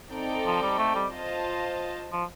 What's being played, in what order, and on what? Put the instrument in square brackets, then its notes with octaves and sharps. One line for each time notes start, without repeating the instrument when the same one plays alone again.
[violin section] C4 D#4 A4 D5 G5
[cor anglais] F3
G3
A3
G3
[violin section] F4 C5 D#5 A5
[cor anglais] F3